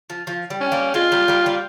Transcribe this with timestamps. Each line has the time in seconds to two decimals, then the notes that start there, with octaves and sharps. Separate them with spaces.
0.10 F3
0.27 F3
0.50 G3
0.61 C#4
0.72 G3 A#3
0.94 G#3 C4 F4
1.12 G3 A#3
1.28 G3 A#3
1.46 G3 A#3